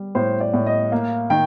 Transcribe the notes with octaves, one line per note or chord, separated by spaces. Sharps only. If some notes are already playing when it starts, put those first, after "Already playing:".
Already playing: G3
A2 C5
D5
A2
D#5
A#3 F5
D#3 G5